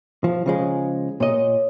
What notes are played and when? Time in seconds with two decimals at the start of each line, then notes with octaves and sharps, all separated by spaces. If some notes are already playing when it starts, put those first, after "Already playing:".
0.24 F3
0.46 C#3 F3 G#3
1.20 A#2 C#5 D#5